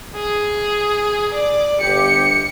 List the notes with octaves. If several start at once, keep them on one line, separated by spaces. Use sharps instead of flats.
G#4
D5
G1 G4 C#7